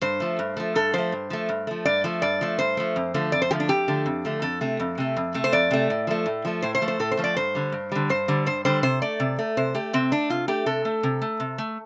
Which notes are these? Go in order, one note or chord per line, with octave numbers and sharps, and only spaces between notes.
G2 C5
F3 A3
G2
F3 A3
G2 A4
F3 A3 C5
G2
F3 A3
G2
F3 A3
G2 D5
F3 A3
G2 D5
F3 A3
G2 C5
F3 A3
F2
D3 F3 A3
F2 D5
C5
D3 F3 A3 G4
D4
F2 G4
D3 F3 A3
F2
D3 F3 A3
F2 A4
C3 A3
F2
C3 A3
F2
C3 A3
C5
F2 D5
C3 A3
A2
F3 A3
A2
F3 A3
A2 C5
C5
F3 A3
C5
A2 A4
C5
F3 A3
D5
G2 C5
D3 G3
G2
D3 G3
G2 C5
D3 G3
G2 C5
D3 G3 C5
C3 C5
A3 D5
C3
A3
C3 C5
A3 G4
C3 C4
A3 D4
C3 F4
A3 G4
C3 A4
A3
C3
A3
C3
A3